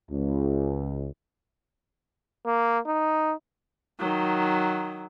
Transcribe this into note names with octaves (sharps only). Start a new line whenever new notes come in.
C#2
A#3
D#4
D#3 F#3